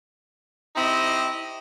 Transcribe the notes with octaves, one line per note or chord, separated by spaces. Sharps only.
C4 D#4 E4 G4 D#5